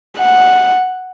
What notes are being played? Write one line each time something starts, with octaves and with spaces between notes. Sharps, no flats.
F#5